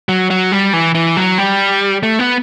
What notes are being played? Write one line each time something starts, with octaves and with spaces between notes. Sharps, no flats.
F#3
F#3
G3
E3
E3
F#3
G3
A3
B3